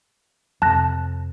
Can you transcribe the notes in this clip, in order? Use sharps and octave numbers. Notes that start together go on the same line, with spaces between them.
F2 C3 A5 F#6 A#6